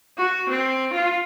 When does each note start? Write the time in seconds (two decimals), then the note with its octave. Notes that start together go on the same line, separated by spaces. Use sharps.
0.18 F#4
0.50 C4
0.94 F4